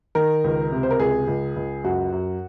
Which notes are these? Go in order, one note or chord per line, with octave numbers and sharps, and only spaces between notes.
D#3 A#4
C#2
C3
C5
A#4
C#2 G#4
C#2
C#2
F#2 F#4
F#2